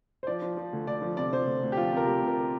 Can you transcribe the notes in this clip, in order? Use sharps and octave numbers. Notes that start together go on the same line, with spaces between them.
C5
F3 D5
F3
F3
D2
D2 D5
F3
C3 D5
F3 C5
D2
D2
G4
F3 F4
C3 A#4
D2 G4
C3
A#4